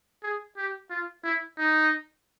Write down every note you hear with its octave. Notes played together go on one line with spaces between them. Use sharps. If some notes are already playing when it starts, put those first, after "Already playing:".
G#4
G4
F4
E4
D#4